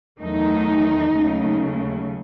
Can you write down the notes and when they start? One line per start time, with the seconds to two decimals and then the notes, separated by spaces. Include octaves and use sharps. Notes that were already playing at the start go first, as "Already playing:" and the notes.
0.19 E2 D#3 F#3 A3 D#4
1.13 D#2 C#3 F#3 A3